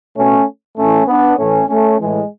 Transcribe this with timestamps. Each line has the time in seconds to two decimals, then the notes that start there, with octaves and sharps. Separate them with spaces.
0.16 B2 A3 C#4
0.77 A2 E3 A3 C#4
1.08 B3 D4
1.38 A2 E3 A3 C#4
1.69 A3 C#4
2.00 A2 E3 G#3